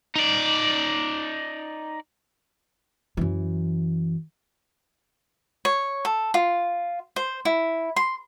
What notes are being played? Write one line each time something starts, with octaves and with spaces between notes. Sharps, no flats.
D#4 D5
F#2 E3
C#5
A4
F4
C5
E4
C6